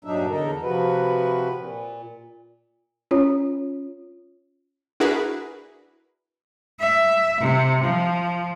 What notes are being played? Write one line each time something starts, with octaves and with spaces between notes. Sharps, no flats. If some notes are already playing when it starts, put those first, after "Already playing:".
G2 A#2 F#3 D4 D#4 E5
E2 D3 D#4 A4 A#4
C3 F3 F#4 B4
A#2
C#4 F4 C#5
D4 E4 F#4 G#4 A#4 B4
E5
C3
F3